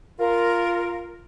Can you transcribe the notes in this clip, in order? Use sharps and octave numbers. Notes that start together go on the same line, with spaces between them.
F4 A#4